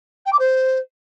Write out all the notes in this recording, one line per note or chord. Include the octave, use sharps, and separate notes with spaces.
G5
D6
C5